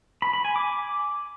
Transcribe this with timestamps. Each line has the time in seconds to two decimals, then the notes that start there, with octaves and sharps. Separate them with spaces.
0.22 B5
0.33 B5
0.45 G#5
0.56 D6